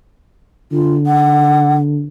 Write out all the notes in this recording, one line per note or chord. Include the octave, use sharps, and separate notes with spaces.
D3 F4
F#5